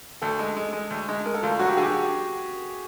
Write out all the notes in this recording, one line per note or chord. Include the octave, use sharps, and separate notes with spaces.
D2 A4
G#3
G#3
G#3
D2
G#3
G#3 A#4
A4
D2 F4
F#3 F#4
G4
D3 G#4
G4
F#4